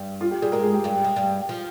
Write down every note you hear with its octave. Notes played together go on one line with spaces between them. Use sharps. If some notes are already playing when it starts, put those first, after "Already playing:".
Already playing: G2 G3
F4
G4
G3 G#4
G#2 G#3 A#4
G#4
G4
G2 G3 G4
G#3
G2 G3
F3